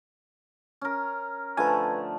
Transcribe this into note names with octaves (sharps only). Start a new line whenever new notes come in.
C#4 A#4
D3 F3 A3 B4 G#5